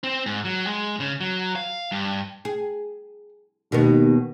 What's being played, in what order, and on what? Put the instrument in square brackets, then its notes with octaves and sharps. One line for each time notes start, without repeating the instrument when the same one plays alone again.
[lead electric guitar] C4
G#2
F#3
G#3
C#3
F#3
F5
G2
[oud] G#4
[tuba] D#2 [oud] B2 D#3 B3